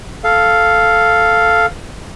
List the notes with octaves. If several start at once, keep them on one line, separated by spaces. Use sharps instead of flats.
A4 F5